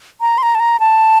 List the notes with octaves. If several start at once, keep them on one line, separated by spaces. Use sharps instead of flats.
A#5
C6
A#5
A5
A#5
A5